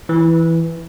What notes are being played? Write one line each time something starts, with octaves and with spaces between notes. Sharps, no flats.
E3